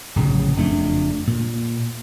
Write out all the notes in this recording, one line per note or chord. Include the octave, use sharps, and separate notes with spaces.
D1 A#1 C#3 F#3
F#1 F2 A3 D4
A#2